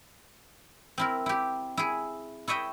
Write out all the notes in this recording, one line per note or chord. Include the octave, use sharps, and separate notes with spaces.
C4 E4 A#4
E4 G4
E4 G#4
E4 C#5 D#5 E5 G5